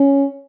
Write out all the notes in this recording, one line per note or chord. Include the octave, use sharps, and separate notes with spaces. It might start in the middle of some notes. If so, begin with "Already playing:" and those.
Already playing: C#4